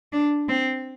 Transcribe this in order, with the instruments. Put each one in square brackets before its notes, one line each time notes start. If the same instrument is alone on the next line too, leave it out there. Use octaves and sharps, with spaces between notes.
[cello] D4
C4